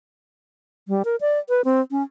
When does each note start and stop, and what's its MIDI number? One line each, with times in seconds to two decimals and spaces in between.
0.88 1.03 55
1.05 1.16 70
1.21 1.38 74
1.49 1.62 71
1.65 1.81 60
1.91 2.03 61